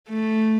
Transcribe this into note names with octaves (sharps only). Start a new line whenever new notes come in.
A3